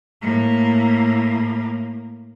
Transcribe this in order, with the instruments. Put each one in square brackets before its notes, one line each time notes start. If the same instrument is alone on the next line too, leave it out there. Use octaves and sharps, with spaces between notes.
[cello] A2 A#3